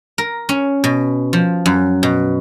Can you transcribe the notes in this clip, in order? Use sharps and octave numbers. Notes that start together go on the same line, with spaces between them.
A#4
C#4
B2
F3
F#2
B2